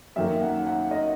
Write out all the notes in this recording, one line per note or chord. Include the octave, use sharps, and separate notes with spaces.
F#2 D#3 A#3 E5
F#5
F#5
D#5